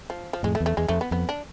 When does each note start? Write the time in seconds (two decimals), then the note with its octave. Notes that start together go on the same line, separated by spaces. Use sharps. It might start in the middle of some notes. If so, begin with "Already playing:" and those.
0.10 F3
0.33 F3
0.43 F2 A2 G#3
0.55 A3
0.60 E2
0.66 A3
0.77 E2 G#3
0.88 F2 A3
1.01 B3
1.11 F2 B3
1.29 D4